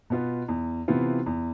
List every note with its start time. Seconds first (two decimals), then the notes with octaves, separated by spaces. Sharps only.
0.10 B2 B3 F4
0.48 E2
0.88 C3 E3 B3 F4
1.26 E2